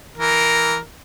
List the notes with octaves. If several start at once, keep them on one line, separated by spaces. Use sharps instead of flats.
E3 A#4